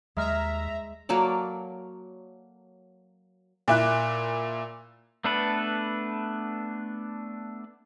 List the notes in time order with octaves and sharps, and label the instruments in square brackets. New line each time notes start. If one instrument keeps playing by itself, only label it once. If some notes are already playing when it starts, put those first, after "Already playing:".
[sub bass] D#2 [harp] G#3 F6 [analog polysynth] E5 A#5
[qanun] F#3 A#3 A4 D5
[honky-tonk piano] A#2 E4 F#6
[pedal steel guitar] A3 B3 D4 A4 B4